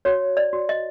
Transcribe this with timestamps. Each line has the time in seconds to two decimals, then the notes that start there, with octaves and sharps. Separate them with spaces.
0.05 F#4 C#5
0.37 D5
0.53 F#4
0.69 D#5